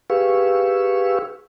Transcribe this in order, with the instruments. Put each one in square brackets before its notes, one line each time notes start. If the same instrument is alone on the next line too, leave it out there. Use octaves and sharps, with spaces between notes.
[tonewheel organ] G4 G#4 B4 F5 C#6 E6